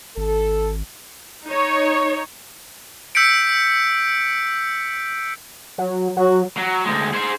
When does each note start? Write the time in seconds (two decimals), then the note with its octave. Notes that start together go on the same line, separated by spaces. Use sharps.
0.17 G#1 A4
1.46 D#4 C#5
3.15 E6 G6 B6 C#7 D7
5.78 F#3
6.17 F#3 F#4
6.58 F#3
6.86 D2 G#3
7.14 G#4 C5